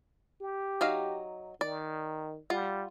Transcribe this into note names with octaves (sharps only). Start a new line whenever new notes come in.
G4
F#3 D#4 F5
D#3 D5
G3 F4 F#5